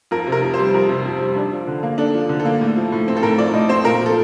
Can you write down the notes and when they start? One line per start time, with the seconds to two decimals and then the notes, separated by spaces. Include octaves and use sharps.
0.11 F2 A#4
0.27 C3
0.32 A#4
0.42 F2
0.54 C5
0.59 G3
0.74 F2 A#4
0.89 C3
1.05 F2
1.21 G3
1.36 D4
1.52 F3
1.67 D3
1.83 A#3
1.98 D4 A4
2.14 F3
2.29 D3
2.40 A4
2.45 A#3
2.61 A2
2.76 F3
2.92 A2
3.08 C4
3.17 A4
3.23 A2 A#4
3.38 F3 D5
3.53 A2 D#5
3.69 C4 C5
3.85 A#2 A#4
4.01 F3
4.06 A4